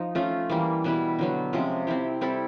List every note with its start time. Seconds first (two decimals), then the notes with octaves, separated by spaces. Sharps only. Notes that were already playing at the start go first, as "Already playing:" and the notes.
Already playing: F3 D#4
0.15 A3 C#4 F4
0.50 E3 G3 A#3
0.84 B2 G3 B3 E4
1.19 D3 F#3 B3
1.53 C3 F3 G#3 C#4
1.87 C4 E4 G4
2.21 G3 C4 E4 A4